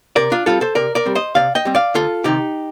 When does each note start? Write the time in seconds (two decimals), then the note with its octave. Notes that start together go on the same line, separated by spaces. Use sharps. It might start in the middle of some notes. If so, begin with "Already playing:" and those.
0.16 C3 A#4 D5
0.32 D4 F4
0.46 G3 C4 F4 A4
0.61 A4 C5
0.75 C3 A#4 D5
0.95 A#4 D5
1.06 G3 C4
1.15 C5 D#5
1.35 C3 D5 F5
1.55 D#5 G5
1.65 G3 C4
1.75 D5 F5
1.95 D2 F4 A4
2.24 C3 D#3 D#4 G4